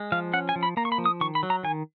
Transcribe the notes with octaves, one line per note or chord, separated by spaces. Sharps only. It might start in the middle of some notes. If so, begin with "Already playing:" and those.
Already playing: G#3
F3 F5
C#4 F#5
G#5
F3
B5
A#3 A#5
C#6
B5
F3
D#6
D#3 C#6
B5
F#3
A#5
D#3 G#5